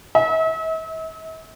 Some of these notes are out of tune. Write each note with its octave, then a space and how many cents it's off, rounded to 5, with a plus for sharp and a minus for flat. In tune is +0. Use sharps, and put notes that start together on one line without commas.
E5 -40